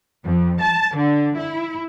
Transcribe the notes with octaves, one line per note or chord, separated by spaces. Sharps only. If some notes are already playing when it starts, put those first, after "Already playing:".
F2
A5
D3
E4